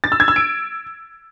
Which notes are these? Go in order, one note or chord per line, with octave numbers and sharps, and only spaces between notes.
A6
E6
G#6
E6
D7